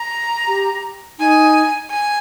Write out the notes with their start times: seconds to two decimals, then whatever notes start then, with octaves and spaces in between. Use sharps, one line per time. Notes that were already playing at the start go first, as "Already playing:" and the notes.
Already playing: A#5
0.48 G4
1.19 D#4 G#5
1.90 G#5